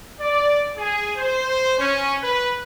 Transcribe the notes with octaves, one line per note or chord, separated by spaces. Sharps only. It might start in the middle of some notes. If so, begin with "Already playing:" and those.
D5
G#4
C5
C#4
B4